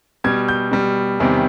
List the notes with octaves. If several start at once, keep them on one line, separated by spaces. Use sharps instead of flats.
B2 G3 G#6
G6
B2 G3
E2 C3 D#3 G3